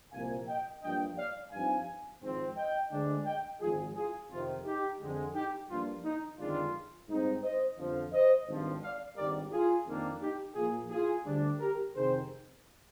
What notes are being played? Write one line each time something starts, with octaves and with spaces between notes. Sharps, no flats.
C2 A#2 F3 A#3 F5 G#5
D#5 G5
G2 F3 A#3 D4 D#5 G5
D5 F5
G2 F3 C4 D#4 F5 G#5
G#1 G#2 F3 C4
D#5 G5
D2 D3 G#3 D4
D#5 G5
G#1 G#2 F3 F4 G#4
F4 G#4
F2 C3 D#3 F4
D#4 G4
F2 D3 G#3
D#4 G4
G2 F3 A#3 D4 F4
D#4
G1 F2 D#3 G#3 D4 F4
G#2 G3 C4 D#4
C5 D#5
G1 F2 D3 F3
C5 D#5
G#1 G2 F3
D5 F5
G#1 G2 D#3 G3 A#4 D5
F4 G#4
F2 D#3 A#3 D4
D#4 G4
A#2 F3 A#3 F4 G#4
F4 G#4
D2 D3 G3 D4
G4 A#4
F2 C3 D#3 G#4 C5